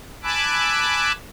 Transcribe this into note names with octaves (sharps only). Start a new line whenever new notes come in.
G#5 A5 B5 D6 E6 F#6